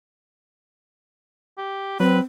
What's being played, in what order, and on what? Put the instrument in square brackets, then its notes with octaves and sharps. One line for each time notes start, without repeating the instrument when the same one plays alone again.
[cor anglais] G4
[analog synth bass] F#3 [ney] C4 [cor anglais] B4